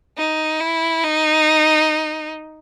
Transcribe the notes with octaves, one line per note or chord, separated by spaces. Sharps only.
D#4
E4
D#4